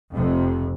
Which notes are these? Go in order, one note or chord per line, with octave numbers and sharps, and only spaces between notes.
F1 F2 C3